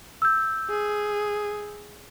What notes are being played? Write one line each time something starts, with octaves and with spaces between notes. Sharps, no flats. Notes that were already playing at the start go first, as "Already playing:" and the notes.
E6 G6
G#4